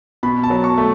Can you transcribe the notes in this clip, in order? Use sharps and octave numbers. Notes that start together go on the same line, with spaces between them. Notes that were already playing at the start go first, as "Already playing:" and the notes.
B2 B5
A5
F#3
C#6
A3